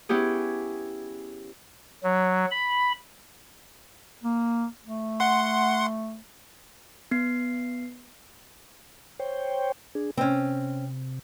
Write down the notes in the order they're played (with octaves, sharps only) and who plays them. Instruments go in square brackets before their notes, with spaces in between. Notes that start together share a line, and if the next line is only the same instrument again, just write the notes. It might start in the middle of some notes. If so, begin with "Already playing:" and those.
[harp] B3 C#4 E4 G4 G#4
[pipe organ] F#3
B5
[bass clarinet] A#3
A3
[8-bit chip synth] F#5 C6
[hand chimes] B3 C7
[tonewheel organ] C5 C#5 G5
D4 G#4
[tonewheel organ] C3 [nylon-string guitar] C4 C#4